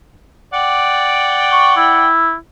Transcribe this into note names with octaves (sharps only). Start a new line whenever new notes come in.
D5 F#5 G5
C#6
E4